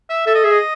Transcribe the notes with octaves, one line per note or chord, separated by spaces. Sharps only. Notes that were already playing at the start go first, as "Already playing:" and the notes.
E5
A4 E5
D#5
G#4 E5
D#5